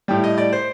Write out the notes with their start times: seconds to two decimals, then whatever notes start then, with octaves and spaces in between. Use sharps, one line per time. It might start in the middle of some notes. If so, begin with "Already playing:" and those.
0.08 A2 G3 G5
0.24 D#5
0.38 D5
0.53 C5